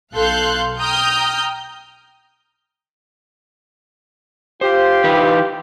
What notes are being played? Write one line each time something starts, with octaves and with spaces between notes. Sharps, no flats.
B1 A4 F5 C6 F#6 G6
G5 A#5 D#6 F6 G6
F4 G4 C5
E3 D#4 B4